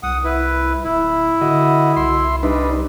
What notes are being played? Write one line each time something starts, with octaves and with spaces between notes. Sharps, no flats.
C2 F#5 D#6
E4 B4
D1 E4
D3 F#4 D#5
C2 E5 C6
G3 D4 D#4 B4